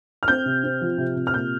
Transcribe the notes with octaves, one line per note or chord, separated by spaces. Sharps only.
F6
C4 G6
C3
C4
F3
C3
C3
F6
A#2 G6